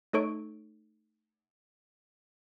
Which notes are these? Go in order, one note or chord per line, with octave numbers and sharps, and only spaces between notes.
A3 D#4 A4 C#5 C#6 D7